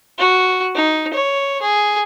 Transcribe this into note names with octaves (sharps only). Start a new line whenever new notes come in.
F#4
D#4
C#5
G#4